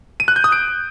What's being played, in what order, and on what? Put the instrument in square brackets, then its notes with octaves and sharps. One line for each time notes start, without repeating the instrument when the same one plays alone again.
[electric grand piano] D#7
F#6
G6
D#6
D7